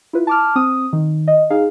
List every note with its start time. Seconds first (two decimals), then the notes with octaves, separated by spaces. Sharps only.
0.13 E4 F4 B4
0.27 A5 D6 F6
0.56 C4 D#6
0.93 D#3
1.28 D#5
1.50 D#4 G#4 F5